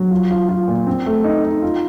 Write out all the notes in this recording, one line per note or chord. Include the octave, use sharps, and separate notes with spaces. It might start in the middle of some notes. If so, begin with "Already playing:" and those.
Already playing: F#3
F4
F4
F4
A#2
C4
A3
D#4
D#4
F4